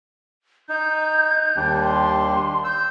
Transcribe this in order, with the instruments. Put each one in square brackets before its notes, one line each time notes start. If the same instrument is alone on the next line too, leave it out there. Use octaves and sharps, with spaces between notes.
[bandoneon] D#4 [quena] G6
[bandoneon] D#2 G3 D4
[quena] C6
[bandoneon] E6 [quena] G6